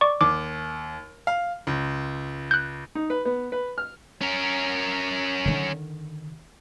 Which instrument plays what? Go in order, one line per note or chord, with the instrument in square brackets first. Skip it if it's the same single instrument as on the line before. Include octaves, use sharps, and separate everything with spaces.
[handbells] D5 C#6 D6
[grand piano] D#2 [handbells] D6
[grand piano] F5
C#2
[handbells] F#6 G6
[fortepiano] D#4
B4
B3
B4
F6
[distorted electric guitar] C#4 A#4
[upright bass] D3 D#3